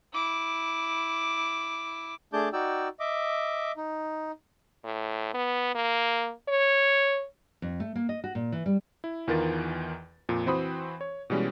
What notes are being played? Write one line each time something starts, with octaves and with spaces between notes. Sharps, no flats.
E4 D6
A3 D4 G#4 A5 D6 G6
D#4 F#4 D5 G5 E6
D#5 E5 D6
D#4
A2
B3
A#3
C#5
F2
A3
A#3
D#5
F#4
A#2
E3
G3
E4
E2 D#3 E3 F4 A#4 A6
F2 A#2
E3 C4 F#4 C5 B5 D#6
C#5
B2 E3 G3 G#3 C#4